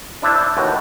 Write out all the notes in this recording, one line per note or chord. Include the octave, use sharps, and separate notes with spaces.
D4 E4 C5 D5 E5
E5
D#2 A2 F#4 B4 G5 A5